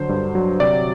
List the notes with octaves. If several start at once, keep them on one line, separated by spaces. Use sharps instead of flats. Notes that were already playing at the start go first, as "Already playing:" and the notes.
Already playing: D3 F#3 C5
G2
F#3
C3 D5